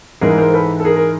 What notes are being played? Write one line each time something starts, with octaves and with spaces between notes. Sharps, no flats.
G#2 E3 G#3 G#4 A#4
A#4 C5
A4 B4
A4
G#4 A#4
A#4